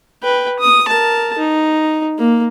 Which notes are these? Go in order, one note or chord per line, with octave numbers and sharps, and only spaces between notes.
B4 G5
D#6
A#4 A5
D#4
A#3